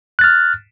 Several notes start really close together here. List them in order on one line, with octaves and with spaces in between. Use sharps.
F#6 A6 F6